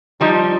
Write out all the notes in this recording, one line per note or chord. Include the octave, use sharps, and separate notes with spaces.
F3 G3 D#4